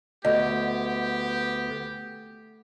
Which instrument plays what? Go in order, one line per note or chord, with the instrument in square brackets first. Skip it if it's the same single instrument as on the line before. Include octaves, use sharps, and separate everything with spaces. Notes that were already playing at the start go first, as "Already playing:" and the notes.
[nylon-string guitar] D2 [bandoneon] B3 [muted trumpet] G4 [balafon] D#5